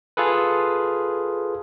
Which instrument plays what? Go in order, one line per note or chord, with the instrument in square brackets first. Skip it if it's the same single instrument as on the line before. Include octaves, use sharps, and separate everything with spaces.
[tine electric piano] F4 G#4 A4 B4